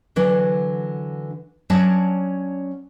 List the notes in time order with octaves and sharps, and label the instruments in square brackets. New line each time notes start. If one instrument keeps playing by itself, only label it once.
[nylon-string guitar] D3 E3 F#3 D4
F#3 C#4 D4 D5 F#5 A5